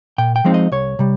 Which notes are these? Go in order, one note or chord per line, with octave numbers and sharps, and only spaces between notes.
A#2 G5
G5
F3 G#3 C4 D#4
D#5
C2 C#5
C3 G3